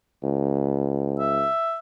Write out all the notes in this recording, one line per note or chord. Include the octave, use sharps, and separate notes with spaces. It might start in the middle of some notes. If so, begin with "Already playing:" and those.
C#2
E5